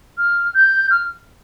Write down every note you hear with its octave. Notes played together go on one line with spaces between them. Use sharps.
F6
G6
F6